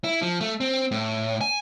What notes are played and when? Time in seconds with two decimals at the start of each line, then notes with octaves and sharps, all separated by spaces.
0.04 E4
0.22 F3
0.41 A3
0.60 C4
0.91 A2
1.41 G#5